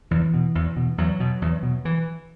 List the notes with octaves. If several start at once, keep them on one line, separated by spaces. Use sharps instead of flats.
E2 E3
B2
E2
B2
E2 F#3
B2
E2
B2
E3